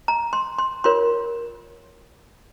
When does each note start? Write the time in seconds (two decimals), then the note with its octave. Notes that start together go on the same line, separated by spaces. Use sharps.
0.08 A#5
0.33 C6
0.59 C6
0.84 F4 A#4 C#5 C6